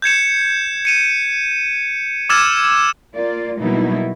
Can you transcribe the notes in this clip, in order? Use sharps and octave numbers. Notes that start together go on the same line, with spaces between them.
G6 G#6 C#7 E7
C#7 D#7 E7
D6 E6 F6 G#6 A6 E7
A#3 F4 D5
B2 F#3 G3 A#3 D#4 E4